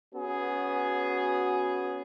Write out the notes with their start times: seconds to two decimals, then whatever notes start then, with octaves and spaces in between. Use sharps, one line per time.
0.15 B3 C#4 F#4 G#4